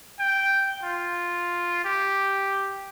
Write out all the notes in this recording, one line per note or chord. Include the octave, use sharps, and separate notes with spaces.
G5
F4
G4